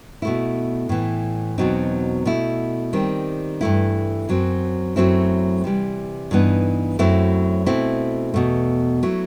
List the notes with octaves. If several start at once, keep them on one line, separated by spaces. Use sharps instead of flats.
B2 A3 E4
A2 E3 A3
E2 B2 F#3 C4 D#4
B2 A3 E4
D#3 G3 C4
G2 E3 A3 E4
F#2 F#3 C4
F#2 F#3 A3 C4 E4
C3 E3 G3
G2 E3 B3 D#4
F#2 F#3 A3 C4 E4
B2 A3 C4 E4
E2 B2 A3
F#3 A3 E4